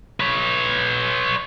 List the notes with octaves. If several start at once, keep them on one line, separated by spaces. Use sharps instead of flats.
B4 C#5